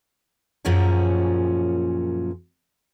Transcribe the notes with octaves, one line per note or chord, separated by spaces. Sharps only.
F#2 A#2 F3 C#4 F#4 G#4